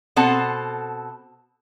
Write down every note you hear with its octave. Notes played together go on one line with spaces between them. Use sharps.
B2 B3 C4 A4 F#5 A5